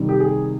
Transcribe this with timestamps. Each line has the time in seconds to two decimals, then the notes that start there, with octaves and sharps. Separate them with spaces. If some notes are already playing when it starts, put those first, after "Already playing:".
Already playing: C3 D#3 G3
0.09 G4
0.20 G#4